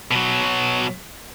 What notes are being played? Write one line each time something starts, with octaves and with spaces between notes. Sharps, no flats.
B2 F#3